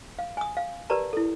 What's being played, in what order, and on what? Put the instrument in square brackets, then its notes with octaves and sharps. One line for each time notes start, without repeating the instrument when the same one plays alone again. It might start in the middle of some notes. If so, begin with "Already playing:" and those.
[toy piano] F5
G#5 D#6
F5
G4 A#4 B4 D5 A5 A#5
E4 A4